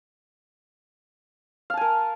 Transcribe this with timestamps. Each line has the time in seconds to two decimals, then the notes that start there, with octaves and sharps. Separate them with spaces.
1.70 F5
1.74 A5
1.77 G#5
1.81 A#4